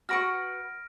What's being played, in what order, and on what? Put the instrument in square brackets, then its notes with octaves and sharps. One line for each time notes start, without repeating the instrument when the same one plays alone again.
[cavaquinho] F#4 B4 C#6 [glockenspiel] F6 A#6 D7